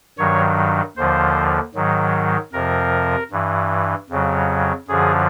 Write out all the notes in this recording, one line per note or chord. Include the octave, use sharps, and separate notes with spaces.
G2 D#3 F#3 C#5
D#2 D3 F3 C5
G#2 D#3 F#3
F2 C3 F3 A#4
G2 E3
F2 C#3 F#3
F#2 D3 F3 G#4